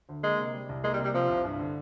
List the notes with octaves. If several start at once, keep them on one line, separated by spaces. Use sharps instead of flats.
D2
G#3 A#3
C3
G3
C2
G#3 A#3
G3
C3
G3
C3 F3
C2
G2
D3